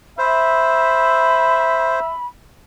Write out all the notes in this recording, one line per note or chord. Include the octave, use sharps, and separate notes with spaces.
C5 E5 B5